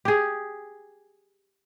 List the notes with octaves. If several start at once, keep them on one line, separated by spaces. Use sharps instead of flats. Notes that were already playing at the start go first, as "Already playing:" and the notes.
G4 G#4